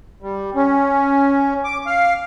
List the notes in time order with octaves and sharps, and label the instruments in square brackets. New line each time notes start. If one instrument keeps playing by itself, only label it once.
[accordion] G3
C#4
D6
F5